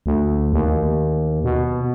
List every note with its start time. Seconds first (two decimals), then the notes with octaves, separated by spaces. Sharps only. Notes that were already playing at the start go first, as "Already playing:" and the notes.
0.06 D2
0.53 D#2
1.44 B2